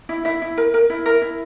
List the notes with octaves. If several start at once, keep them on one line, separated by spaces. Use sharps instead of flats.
E4
E4 E5
E4
A#4
A#4
E4
A#4
E4